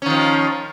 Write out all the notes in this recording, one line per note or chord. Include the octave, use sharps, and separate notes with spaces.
D#3 F3 C#4